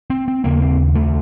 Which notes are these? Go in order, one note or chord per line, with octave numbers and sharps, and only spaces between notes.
C4
C4
D#2 C#3 A#3
C4
A3